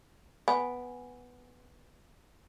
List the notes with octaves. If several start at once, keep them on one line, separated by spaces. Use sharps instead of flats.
B3 G#5